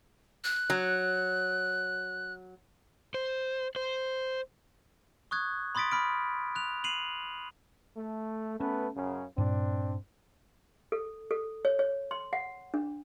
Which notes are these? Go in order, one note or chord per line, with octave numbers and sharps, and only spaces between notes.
F#6
F#3
C5
C5
C#6 D#6 F#6 G#6
B5 C6 D#6 A6 B6 D7
B5 F6 D7
F#6 F7
C7 D#7 F7 F#7
A3
A3 B3 C#4 B4
F#2 C#3
G2 A#2 C4 D4
A4
A4
C#5
C#5
C6
F#5
D4